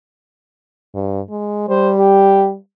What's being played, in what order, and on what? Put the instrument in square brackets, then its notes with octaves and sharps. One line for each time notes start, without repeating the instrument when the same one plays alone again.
[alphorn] G2
G#3
[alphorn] G3 [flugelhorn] C5
[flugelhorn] G4